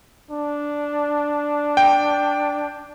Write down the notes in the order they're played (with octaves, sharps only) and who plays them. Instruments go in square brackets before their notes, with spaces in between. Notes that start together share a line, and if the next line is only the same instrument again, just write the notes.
[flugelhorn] D4
[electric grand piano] G5